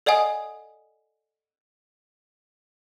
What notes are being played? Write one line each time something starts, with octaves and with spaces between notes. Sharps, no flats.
A4 D5 D#5 F#5 G#5 D#6